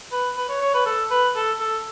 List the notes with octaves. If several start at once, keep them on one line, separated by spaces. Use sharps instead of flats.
B4
B4
C#5
C#5
B4
A4
B4
A4
A4